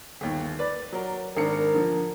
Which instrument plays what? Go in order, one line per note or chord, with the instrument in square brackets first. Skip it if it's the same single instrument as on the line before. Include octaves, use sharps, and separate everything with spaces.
[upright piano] G1 D#2
B4 D5
F#3 A#4
[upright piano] G#1 D4 C#7 [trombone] A#4
[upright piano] D3 F3